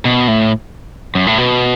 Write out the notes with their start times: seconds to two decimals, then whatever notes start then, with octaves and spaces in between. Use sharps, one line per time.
0.05 B2
0.28 A2
1.15 F#2
1.27 A2
1.38 B2